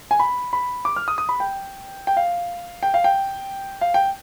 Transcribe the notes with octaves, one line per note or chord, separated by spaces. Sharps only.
G#5
B5
B5
D6
F6
D#6
D#6
B5
G5
G5
F5
G5
F5
G5
F5
G5